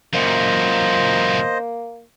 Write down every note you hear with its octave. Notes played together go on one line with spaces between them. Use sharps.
F#2 A#2 A#3 C5 D#5